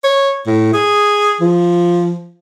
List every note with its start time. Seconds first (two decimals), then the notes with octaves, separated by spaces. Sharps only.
0.04 C#5
0.46 A2
0.73 G#4
1.40 F3